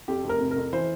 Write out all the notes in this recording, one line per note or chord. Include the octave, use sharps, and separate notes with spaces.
F2 G4
F1
A#4
C3
A#4
F2
E3 C5